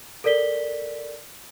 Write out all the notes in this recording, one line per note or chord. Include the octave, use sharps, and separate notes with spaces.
A4 A#4 D5 B6 G7